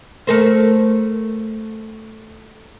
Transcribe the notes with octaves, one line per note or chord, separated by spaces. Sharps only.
A3 A#4 C5